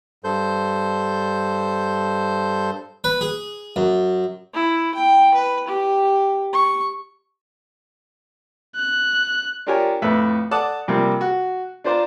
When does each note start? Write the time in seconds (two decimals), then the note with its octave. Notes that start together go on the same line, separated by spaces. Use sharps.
0.24 G2 A4 C5 G6
3.04 B4
3.21 G#4
3.76 F#2
4.54 E4
4.95 G5
5.34 B4
5.68 G4
6.53 C#6
8.76 F#6
9.67 D4 F4 G4 A#4 C#5 G#5
10.02 F2 A2 A4 B4 E5
10.51 A4 D5 F#5 A5 D6 D#6
10.88 C3 F3 G3 A#3
11.21 F#4
11.84 D4 F4 C5 D5 F5 A#5